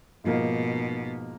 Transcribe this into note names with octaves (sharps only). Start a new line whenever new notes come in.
G#2 B2 F3 A#3 D#4